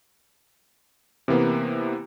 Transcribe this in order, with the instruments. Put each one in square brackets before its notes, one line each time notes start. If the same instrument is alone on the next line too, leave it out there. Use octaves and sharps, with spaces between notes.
[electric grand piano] C3 E3 A#3 B3